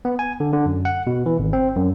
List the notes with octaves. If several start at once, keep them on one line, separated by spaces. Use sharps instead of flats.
B3
G#5
D3
D3
F#2
F#5
B2
E3
G#1
C4
F#2